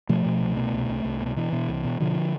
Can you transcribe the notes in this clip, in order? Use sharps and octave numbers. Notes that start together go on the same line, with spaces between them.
B2 F3 A3
B2
C2
B2
C2
C2
C2
B2
B2 E3
B2
C2
B2
B2 D3 F3